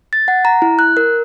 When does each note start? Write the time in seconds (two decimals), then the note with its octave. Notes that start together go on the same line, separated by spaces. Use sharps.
0.13 A6
0.28 F#5
0.45 A#5
0.62 E4
0.79 F#6
0.97 A#4